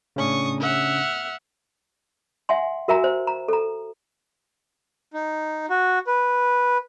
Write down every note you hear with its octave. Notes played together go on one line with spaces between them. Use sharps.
A2 C#3 C#4 D4 C#6 D#6
E5 F#5 F6
E5 F#5 G#5 C6
F#4 A#4 E5 G#5 A#5
C5
A#5
A4 A#5
D#4
F#4
B4